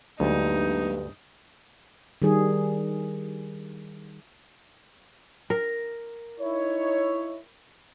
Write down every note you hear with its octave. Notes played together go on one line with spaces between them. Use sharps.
D2 G2 F#3 G#3 A#3 D#4
D#3 G3 G#4
A#4
D#4 E4 C#5